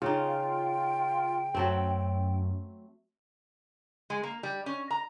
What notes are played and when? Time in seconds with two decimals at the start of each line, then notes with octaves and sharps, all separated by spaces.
0.02 C#3 D#4 F4 G5
1.55 F#2 F#3 A3 C4
4.10 G#3
4.23 A#3
4.43 G3
4.66 C#4
4.91 A#5